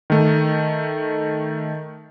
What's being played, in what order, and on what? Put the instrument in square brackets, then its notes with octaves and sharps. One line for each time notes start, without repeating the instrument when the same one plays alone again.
[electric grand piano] D#3 A3